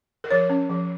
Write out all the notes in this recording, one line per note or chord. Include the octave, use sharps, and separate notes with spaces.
A#4
F3 C#5
C#4
F3